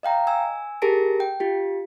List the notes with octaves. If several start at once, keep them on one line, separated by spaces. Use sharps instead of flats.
D#5 F5 G5 A#5
G#5 E6
G4 G#4 A#4 A5 A#6 D7
G5
F4 G4